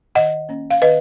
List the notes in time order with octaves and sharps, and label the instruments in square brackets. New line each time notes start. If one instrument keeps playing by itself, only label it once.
[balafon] D#3 D#5 F#5
A#3 C#4
F5
D#3 B4 D#5